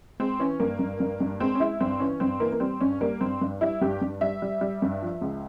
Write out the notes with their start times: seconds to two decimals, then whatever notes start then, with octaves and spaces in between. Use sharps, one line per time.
0.20 G#3 C4
0.39 E3 C#4
0.60 G2 A#3
0.79 G2
1.00 G2
1.20 G2
1.40 G#3 C4
1.55 C#4
1.60 G#3 E4
1.80 G2 C4
2.00 E3 C#4
2.20 G2 C4
2.40 E3 A#3
2.52 A#3
2.60 G3 C4
2.81 G2 C#4
3.01 G3 A#3
3.21 G2 C4
3.41 G2
3.61 G3 E4
3.81 G2 G4
4.01 G2
4.21 G3 E5
4.42 G3
4.61 G3
4.82 G2
5.02 F3
5.21 C#2